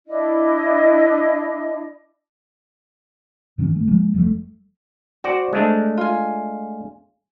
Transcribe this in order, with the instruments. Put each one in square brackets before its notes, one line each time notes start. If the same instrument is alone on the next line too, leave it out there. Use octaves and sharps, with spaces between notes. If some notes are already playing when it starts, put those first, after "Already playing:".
[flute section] D4 E4 D#5
[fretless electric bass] G2 D#3 E3 C#4
A3
F3 G#3 A#3
F1 F3 G3 A3
[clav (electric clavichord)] F#4 D5 [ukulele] C5
[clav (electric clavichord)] G#3 A3 D4
[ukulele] F4 G#5